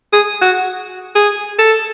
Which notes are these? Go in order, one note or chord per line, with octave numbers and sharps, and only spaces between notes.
G#4
F#4
G#4
A4